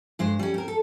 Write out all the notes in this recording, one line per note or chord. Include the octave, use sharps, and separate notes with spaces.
G2 G#3 C5
G3 C#4
C4 A#4
A4